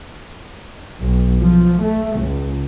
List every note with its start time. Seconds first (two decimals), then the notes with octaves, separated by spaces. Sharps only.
1.01 B1
1.42 F3
1.81 A3
2.18 C#2